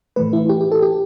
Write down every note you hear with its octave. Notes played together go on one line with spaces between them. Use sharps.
A2 E3 A3 B4
E4
G4
G4
A4
G4